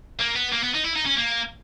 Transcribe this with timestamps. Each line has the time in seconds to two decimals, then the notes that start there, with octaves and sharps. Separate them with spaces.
0.20 A#3
0.36 B3
0.52 A#3
0.63 B3
0.74 D#4
0.84 E4
0.96 D#4
1.06 C#4
1.17 A#3